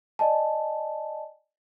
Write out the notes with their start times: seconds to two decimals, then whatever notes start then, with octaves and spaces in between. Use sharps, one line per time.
0.19 D5 D#5 G#5 A5